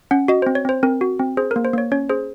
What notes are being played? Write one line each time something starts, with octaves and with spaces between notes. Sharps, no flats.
C#4 F#5
F#4 D#5
C5
C4
C#5
C4 C5
C4 A#4
F#4
C4
G#4 C5
A#4
A#3
C5
A#3 C#5
C#4 C#5
G#4 C5